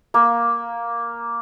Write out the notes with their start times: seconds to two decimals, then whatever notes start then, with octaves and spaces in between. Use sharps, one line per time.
0.14 A#3